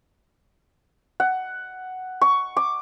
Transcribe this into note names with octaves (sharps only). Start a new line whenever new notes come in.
F#5
C#6
D6